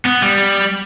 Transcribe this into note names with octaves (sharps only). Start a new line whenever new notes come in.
B3
G3